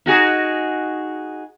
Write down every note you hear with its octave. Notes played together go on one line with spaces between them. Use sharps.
D#4 F#4 G#4